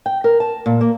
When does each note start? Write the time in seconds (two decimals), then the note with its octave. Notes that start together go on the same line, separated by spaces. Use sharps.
0.06 G5
0.24 A#4
0.40 A5
0.66 A#2
0.81 A#3